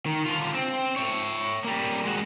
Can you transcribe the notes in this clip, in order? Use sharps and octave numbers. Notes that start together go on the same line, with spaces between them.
D#3
D3 F4
C4
C#5 E5
G3 A#3
G#3 F#4